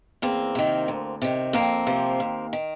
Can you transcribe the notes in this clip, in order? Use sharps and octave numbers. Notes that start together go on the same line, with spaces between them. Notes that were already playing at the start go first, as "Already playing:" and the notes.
E2 A#3 C4
C3 D#3
D2
C3 D#3
F2 A#3 C4
C3 F3
D#2
D#3